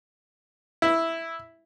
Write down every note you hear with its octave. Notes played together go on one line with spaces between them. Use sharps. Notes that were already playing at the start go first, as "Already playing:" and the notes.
E4